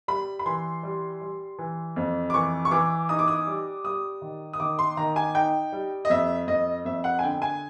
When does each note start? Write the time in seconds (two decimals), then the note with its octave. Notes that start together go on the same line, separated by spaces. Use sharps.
0.08 G3 B5
0.39 B5
0.46 E3 C6
0.83 G3
1.21 G3
1.59 E3
1.96 F2
2.30 D6
2.34 E3 C#6
2.65 C#6
2.71 E3 D6
3.09 D#4 D#6
3.19 D6
3.28 D#6
3.47 G3
3.84 G3 D#6
4.22 D#3
4.53 D#6
4.60 D#3 D6
4.79 C6
4.97 D#3 A#5
5.16 G#5
5.35 D#4 G5
5.72 G3
6.05 D#5
6.10 F2 E5
6.47 F2 D#5
6.85 F2 E5
7.04 F#5
7.19 G#5
7.23 D3 G5
7.42 G#5